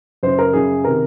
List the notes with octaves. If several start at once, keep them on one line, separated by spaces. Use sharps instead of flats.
F#2 C#3 C5
A#4
F#2 C#3 G#4
C3 D#3 A#4